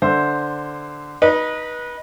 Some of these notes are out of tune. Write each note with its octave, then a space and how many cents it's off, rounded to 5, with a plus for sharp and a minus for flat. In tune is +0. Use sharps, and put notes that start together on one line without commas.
D3 +0 C5 +0 E5 +0
D#4 +0 B4 -25